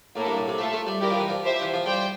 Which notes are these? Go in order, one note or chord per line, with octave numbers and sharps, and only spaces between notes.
A2 A#3 E4 A4
G2
A2
C3
A3 F4 A4 E5 A5
A3
G3
G3 E4 G4 A#4 D5
F3
E3
F3
G4 C5 E5
E3
F3
G3 C5 G5